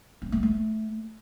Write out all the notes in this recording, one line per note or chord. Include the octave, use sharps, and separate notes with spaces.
C#4
A3
A3